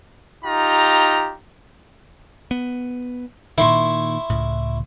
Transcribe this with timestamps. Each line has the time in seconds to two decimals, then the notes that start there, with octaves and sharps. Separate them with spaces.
0.45 D#4 F4 G4 A#5
2.51 B3
3.58 A#2 D#3 E4 C6 C#6
4.30 C#2 A2